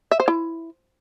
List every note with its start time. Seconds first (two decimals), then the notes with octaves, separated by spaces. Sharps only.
0.11 E5
0.20 C5
0.28 E4